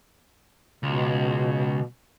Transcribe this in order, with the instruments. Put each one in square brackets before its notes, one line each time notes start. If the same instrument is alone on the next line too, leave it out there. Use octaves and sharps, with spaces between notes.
[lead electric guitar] C#2 [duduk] B2